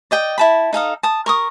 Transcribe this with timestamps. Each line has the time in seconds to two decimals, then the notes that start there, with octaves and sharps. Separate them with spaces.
0.11 D5 D#5 G5
0.38 E4 A5 B5
0.73 D#4 A4 F5 D#6
1.03 A5 D#6
1.26 A#4 C#6 D#6